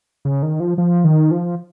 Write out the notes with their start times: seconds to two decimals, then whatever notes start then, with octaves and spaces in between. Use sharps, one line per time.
0.25 C#3
0.43 D#3
0.60 F3
0.78 F3
1.04 D#3
1.31 F3